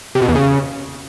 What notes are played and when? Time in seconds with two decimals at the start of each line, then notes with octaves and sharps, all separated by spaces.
0.15 C3
0.22 B2
0.28 E2
0.35 C#3